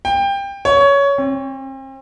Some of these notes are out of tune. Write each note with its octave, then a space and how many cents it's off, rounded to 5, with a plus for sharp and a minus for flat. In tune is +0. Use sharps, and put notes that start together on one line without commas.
G5 +20
C#5 +15
C4 +40